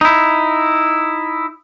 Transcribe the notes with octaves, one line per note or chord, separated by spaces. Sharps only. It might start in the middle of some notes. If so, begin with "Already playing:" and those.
D#4 E4